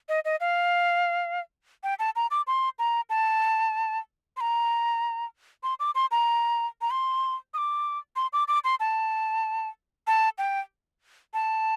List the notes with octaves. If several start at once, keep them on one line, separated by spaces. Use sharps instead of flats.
D#5
D#5
F5
G5
A5
A#5
D6
C6
A#5
A5
C6
A#5
C6
D6
C6
A#5
A#5
C6
D#6
D6
C6
D6
D6
C6
A5
A5
G5
A5